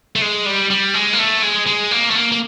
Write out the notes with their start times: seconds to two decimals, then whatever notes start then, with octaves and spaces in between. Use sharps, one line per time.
0.16 A3
0.22 G#3
0.46 G3
0.70 G3
0.94 G#3
1.13 A#3
1.19 A3
1.43 G#3
1.66 G#3
1.91 A#3
2.10 A3
2.15 A#3
2.32 A#3